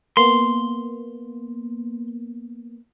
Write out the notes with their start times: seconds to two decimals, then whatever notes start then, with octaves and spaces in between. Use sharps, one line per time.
0.17 A#3 B3 C6